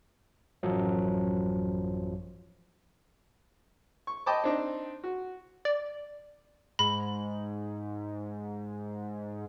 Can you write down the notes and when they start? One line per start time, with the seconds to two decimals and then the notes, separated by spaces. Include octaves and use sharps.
0.63 A1 F#2 F3 F#3
4.07 C#6
4.26 D#5 G5 A5 B5 D6 D#6
4.44 C4 D4 D#4
5.04 F#4
5.65 D5
6.79 G#2 B5